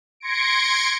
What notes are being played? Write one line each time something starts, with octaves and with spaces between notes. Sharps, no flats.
C6 G#6 A#6 C#7 D7